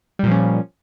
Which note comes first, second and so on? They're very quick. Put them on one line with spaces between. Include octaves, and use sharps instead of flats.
G3 A#2 F3 C#4